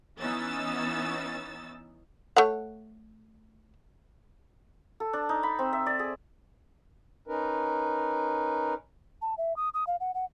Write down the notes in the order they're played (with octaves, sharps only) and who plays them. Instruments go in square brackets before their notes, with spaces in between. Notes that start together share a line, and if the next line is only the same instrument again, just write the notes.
[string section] E3 B3 C#4 D#4 E6 A6
[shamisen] A3 C#5 F#5
[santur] A4
D4
D#4
B5
C4
E5
D5
G#4
[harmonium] C#4 D#4 A#4 B4
[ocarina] A5
E5
D#6
D#6
F5
F#5
F#5